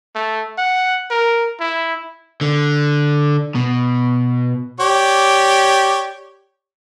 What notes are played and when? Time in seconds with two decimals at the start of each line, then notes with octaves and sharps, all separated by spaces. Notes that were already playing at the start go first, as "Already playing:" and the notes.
0.15 A3
0.58 F#5
1.11 A#4
1.60 E4
2.41 D3
3.55 B2
4.80 G4 C#5 D5